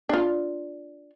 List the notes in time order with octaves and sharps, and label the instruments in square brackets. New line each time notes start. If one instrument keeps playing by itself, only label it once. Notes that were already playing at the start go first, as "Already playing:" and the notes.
[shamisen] D4 F4